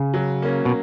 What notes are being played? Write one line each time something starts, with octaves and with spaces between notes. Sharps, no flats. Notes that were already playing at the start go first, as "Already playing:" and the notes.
Already playing: C#3
F#3
A#3 C#4
B2